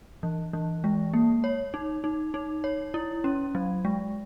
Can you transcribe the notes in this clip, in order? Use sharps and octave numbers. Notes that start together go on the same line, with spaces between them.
E3
E3
G#3
A#3
C#5
D#4
D#4
D#4
C#5
E4
C#4
F#3
G#3